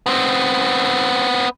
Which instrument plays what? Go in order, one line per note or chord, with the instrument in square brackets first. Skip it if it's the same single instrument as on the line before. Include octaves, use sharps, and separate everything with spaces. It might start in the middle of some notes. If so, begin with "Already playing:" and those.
[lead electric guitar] B3 C4